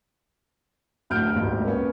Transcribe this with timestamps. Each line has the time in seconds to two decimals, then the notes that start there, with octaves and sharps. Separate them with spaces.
1.10 D1 D2 F6 G6 D7
1.35 D#1 G#1 C#2
1.63 A#3 B3 C#4